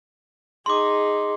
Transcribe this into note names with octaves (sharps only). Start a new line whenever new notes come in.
D#4 G#4 C6 D6